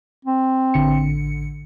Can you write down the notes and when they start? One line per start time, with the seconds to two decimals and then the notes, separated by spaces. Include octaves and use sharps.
0.25 C4
0.74 A1 D3 C#7